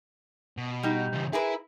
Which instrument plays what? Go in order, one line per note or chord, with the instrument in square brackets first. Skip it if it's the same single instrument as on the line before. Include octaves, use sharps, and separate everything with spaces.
[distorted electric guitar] B2
[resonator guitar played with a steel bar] G3 D#4
[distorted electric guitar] C#2 E3
[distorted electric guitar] E4 [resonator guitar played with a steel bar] G#4 A#4 B4